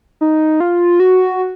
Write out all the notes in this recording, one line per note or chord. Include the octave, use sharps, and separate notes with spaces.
D#4
F4
F#4